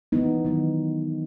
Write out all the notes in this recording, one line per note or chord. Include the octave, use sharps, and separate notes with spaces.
E3 B3 D#4
D#3 F#3 B3